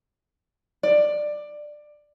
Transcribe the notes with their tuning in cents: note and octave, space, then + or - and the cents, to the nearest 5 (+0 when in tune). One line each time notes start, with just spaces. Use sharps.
D5 +15